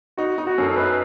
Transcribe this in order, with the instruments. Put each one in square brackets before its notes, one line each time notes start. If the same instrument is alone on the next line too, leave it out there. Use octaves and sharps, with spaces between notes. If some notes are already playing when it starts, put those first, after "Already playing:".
[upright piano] D#4 [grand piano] F#4
[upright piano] D#4
[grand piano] F#4
[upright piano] F#2 [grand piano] A4
[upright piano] D#4 [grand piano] B4